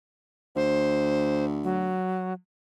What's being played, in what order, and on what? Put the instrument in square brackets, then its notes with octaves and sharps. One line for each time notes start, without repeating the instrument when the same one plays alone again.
[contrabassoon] D2 [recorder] C5
[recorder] F#3